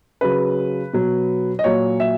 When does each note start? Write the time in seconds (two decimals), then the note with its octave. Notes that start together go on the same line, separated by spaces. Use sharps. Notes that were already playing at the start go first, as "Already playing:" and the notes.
0.21 C#3 F#3 B4
0.93 B2 F#3
1.59 D#5
1.64 A#2 F#3 C#5
2.00 E5